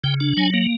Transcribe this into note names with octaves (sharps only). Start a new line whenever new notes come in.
C#3 G5
D4
F#3 G#5
A#3